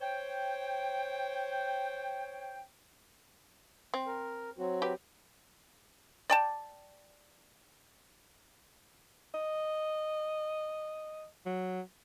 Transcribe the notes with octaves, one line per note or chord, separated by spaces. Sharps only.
C5 C#5 G5
C4
A#4
F#3 C4 F#4
G4 B4
D5 G5 A5
D#5
F#3